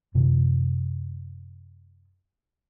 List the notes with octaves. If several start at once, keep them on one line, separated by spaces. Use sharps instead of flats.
F#2 C3 D#3 F3